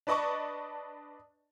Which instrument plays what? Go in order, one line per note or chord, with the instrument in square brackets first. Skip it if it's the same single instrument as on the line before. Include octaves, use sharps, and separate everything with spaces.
[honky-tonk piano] D4 B4 D5 D#5 A5 C#6